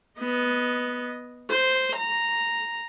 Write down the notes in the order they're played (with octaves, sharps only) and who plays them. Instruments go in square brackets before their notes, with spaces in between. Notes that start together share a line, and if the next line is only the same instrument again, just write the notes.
[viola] B3 D#5
C5
A#5